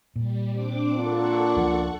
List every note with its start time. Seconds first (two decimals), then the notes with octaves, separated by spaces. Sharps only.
0.16 A#2 G3
0.50 C4 D4 D6
0.95 A#3 D4 F4 A4 F#5 C#6
1.56 C#2 F3